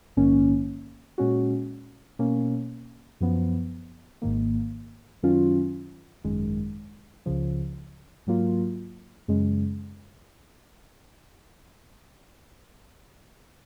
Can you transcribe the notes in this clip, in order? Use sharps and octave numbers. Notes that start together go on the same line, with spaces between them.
A#1 G#2 D#3 A#3 C#4
A#2 G#3 C#4 F#4
B2 A#3 C#4
F#2 F3 B3
G#1 G#2 D#3 A#3
F#2 D#3 F#3 C#4 F4
G#1 F#2 D#3 G#3
C#2 C#3 F3
G#2 F#3 A#3 F4
F#2 C#3 G#3